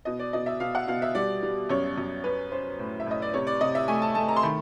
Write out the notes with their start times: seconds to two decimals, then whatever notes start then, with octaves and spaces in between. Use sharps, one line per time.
0.05 B2 D#5
0.19 D5
0.33 B2 D#5
0.46 E5
0.60 B2 F5
0.75 F#5
0.88 B2 F5
1.02 E5
1.15 G3 D5
1.43 G3
1.69 F#2 C#5
1.97 F#2
2.24 C#4 B4
2.52 C#4 C5
2.79 A2
3.00 E5
3.06 A2 D#5
3.22 D5
3.34 C3 C#5
3.47 D5
3.61 C3 D#5
3.75 E5
3.88 A3 G#5
4.02 A5
4.15 A3 A5
4.28 A#5
4.36 C6
4.43 D#3 B5